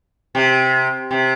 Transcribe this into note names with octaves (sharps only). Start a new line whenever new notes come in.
C3
C3